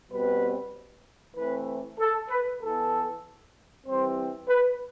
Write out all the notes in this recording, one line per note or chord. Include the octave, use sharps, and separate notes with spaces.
B2 G3 C4 B4
E3 A3 C4 B4
A4
B4
E3 B3 A4
E3 G3 C4 C5
B4